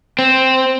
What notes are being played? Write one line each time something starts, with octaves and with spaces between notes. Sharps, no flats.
C4